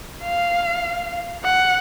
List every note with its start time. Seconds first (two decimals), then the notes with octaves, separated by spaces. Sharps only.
0.24 F5
1.44 F#5